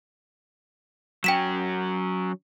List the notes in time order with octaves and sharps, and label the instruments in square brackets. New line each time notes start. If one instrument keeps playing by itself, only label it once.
[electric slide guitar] F#3 C#4 [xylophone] G5 B6 E7